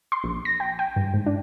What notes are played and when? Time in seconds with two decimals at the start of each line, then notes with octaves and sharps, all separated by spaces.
0.12 C6
0.24 A#1
0.45 A#6
0.60 G5
0.79 G5
0.96 G2
1.14 G#2
1.26 D4